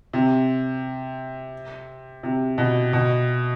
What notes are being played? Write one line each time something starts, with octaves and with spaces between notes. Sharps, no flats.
C3
C3
B2
B2